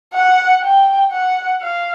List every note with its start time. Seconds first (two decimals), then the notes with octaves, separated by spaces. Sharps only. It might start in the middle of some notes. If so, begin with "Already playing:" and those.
0.14 F#5
0.63 G5
1.12 F#5
1.62 F5